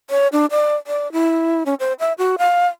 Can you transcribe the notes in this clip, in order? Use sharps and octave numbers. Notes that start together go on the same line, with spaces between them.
C#5
D4
D5
D5
E4
C#4
C5
E5
F#4
F5